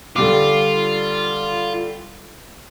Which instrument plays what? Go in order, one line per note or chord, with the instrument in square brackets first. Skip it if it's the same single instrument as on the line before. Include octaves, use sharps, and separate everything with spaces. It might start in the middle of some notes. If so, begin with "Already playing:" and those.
[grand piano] D3 G3 D6 [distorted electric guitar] F4